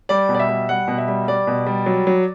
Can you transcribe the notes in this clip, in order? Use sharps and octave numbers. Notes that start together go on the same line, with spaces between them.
G3 D5
B2
D5
E5
G3
G3 F#5
B2
E5
G3
G3 D5
B2
G3
F#3
F#3